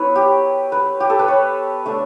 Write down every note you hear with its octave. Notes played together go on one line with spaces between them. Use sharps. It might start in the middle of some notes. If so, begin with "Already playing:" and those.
Already playing: F#3 B3 E4 B4 C#5
G4
B4
G4
A4
B4
C#5
A3 D4